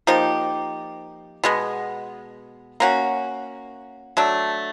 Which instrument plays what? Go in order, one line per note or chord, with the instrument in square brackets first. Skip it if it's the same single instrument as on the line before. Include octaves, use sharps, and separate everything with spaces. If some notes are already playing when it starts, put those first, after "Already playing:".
[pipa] F3 A#3 D#4 G4
B2 G#3 B3
A#3 C#4 F#4
F#3 A3 D4